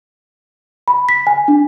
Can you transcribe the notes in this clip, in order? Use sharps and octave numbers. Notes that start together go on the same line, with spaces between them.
B5
B6
G#5
D4